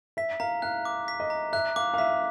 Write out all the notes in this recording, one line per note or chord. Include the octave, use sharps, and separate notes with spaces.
E5 B6
F5 A#5
F5 F#6
D6
B6
D#5
A#5
E5 F#6
F5 D6
F5
E5 B6